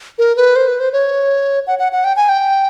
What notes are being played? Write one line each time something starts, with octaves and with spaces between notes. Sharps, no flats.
A#4
B4
C5
B4
C5
C#5
F#5
F#5
F#5
G5
G#5
G5